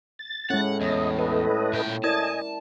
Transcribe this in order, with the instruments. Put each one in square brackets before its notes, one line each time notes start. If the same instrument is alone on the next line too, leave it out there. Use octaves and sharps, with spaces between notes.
[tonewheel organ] A6
[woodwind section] A2 [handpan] G#3 C#4 [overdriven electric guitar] F#5
[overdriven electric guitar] E2 [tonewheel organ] D#5
[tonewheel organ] A4 B4 D#5
[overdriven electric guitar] A#2 G5
[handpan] E4 A#4 D5 [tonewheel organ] D#5 G#5 [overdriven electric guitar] A5